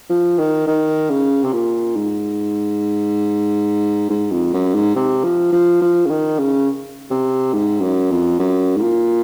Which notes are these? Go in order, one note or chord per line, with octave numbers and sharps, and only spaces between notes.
F3
D#3
D#3
C#3
C3
A#2
G#2
G#2
F2
F#2
G#2
C3
F3
F3
F3
C#3
D#3
C#3
C3
G#2
F#2
F2
F#2
G#2
A#2